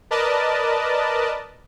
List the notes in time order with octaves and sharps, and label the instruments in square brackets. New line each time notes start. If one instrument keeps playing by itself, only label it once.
[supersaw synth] A#4 B4 D5 D#5 A5